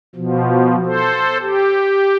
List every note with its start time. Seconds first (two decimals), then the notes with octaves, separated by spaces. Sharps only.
0.16 B2 F3
0.86 A4 C5
1.41 G4